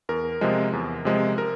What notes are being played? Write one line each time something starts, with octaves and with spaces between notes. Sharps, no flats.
E2 A#4
C3 F3 G#3
E2
C3 F3 G#3
A#4